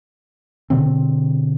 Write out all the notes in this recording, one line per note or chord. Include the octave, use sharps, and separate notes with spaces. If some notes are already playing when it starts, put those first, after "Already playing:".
B2 D3 C4